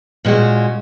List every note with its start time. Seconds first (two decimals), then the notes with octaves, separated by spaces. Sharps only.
0.25 A#2 G#3 C#4 F#4